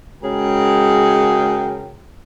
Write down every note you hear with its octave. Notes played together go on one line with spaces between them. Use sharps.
C#3 G#3 F#4 G#4 A#4 G5